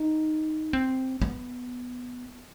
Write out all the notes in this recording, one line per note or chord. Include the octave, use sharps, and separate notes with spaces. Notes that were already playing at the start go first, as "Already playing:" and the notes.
Already playing: D#4
C4
B3